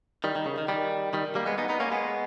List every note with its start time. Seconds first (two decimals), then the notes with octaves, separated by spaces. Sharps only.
0.24 D#3 G3
0.36 D#3
0.46 C#3
0.58 D#3
0.68 D#3 G3
1.13 D#3 G3
1.35 G3 A#3
1.46 G#3 B3
1.58 B3 D#4
1.69 B3 D#4
1.80 A#3 C#4
1.91 G#3 B3